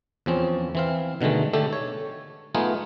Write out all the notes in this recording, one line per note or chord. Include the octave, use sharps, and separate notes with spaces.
E2 F3 C4 C#4
E3 C4 F5
B2 D3 D#3 G#3 A3
D3 A3 G4 A4
C#5
G#3 A3 B3 D#4 F4 G#4